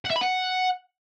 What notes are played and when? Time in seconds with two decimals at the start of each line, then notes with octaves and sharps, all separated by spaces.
0.05 F#5
0.10 E5
0.16 B5
0.21 F#5